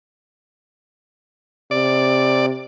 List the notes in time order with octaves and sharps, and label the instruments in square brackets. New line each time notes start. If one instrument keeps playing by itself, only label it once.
[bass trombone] C3 [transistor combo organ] D5